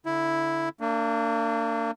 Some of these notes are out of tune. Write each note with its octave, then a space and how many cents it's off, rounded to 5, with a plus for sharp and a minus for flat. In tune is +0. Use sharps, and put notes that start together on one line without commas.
D3 -15 E4 +0
A#3 -35 D4 +0